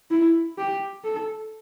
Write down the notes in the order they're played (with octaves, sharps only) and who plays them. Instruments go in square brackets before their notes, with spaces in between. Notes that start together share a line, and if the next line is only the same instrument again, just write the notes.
[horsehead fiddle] E4
G4
A4